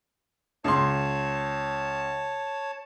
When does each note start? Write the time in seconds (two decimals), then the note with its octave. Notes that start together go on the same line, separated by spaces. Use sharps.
0.64 C#2 C#5 A5 C6